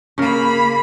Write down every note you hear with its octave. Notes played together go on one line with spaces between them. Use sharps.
C#3 A#3 A#4 B5